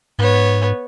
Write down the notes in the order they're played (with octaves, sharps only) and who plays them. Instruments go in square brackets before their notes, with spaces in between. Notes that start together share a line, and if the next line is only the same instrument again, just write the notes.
[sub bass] G#2 [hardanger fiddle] B3 C#5